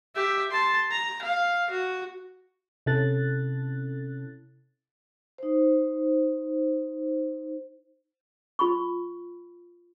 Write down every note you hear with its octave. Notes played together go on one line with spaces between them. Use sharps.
G4 E5
A5 C6
A#5
F5
F#4
C3 C#4 E4 A4 F#6 A6
D#4 C5
F4 B5 C#6